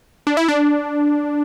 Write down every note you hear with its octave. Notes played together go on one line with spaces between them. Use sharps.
D4
E4
D4